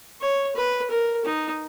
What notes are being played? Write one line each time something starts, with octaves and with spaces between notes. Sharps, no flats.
C#5
B4
A#4
D#4